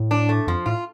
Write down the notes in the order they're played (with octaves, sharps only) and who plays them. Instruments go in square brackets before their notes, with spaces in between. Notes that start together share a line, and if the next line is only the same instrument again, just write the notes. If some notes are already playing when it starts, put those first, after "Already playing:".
Already playing: [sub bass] A2
[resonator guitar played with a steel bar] D4
A3
[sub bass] F2 [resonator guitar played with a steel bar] F3
[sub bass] A2 [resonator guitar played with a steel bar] F4